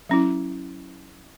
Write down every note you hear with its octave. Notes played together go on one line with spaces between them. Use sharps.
F#3 C#4 E4